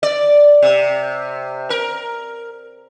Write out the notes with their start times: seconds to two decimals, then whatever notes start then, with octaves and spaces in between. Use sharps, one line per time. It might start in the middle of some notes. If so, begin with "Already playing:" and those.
0.03 D5
0.62 C3
1.70 A#4